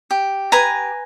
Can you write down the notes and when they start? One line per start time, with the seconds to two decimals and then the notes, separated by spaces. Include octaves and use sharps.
0.11 G4
0.52 B4 G#5 A#5